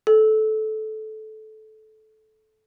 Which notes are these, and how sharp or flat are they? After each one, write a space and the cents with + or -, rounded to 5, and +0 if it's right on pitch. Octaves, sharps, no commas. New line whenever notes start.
A4 -20